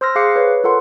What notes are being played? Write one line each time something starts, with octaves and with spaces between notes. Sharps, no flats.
C5 C6 E6 F6 A#6
G#4 F5 D6 F#6 C7 C#7
B4 C#5
F4 A4 A#4 F#5 C6